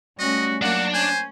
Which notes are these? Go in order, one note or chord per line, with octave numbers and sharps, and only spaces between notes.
G3 A3 C#4 F#4 D#5
F#3 A#3 D4 F#4 D5 F#5
C#4 C5 G#5